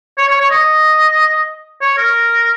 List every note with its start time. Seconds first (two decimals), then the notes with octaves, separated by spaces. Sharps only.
0.18 C#5
0.29 C#5
0.40 C#5
0.51 D#5
1.81 C#5
1.98 A#4